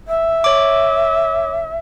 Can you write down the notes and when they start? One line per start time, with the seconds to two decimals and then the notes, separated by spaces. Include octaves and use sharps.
0.07 E5
0.44 C#5 D6